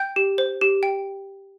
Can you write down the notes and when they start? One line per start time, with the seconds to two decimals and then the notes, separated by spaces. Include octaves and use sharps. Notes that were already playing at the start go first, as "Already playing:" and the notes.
Already playing: G5 G6
0.16 G4
0.38 C5
0.61 G4
0.83 G5